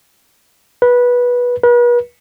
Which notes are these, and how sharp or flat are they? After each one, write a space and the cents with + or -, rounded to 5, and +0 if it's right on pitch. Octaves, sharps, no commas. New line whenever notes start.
B4 -15
B4 -40